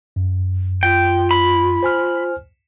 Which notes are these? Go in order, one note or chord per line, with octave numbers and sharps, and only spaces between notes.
F#2
F4 G5
B5
C5 G#5 F6